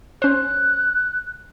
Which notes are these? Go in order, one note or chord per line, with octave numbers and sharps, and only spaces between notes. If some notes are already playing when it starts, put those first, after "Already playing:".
C#4 C5 F#6